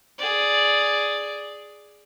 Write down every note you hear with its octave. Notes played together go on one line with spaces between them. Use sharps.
G#4 D5